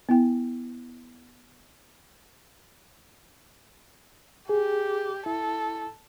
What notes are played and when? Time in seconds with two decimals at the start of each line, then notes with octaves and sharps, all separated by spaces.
0.09 B3 E4 G5
4.49 G4 G#4
5.26 E4 A4